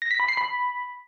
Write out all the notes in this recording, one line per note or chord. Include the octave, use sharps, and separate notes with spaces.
A#6
B6
B5
C7
B5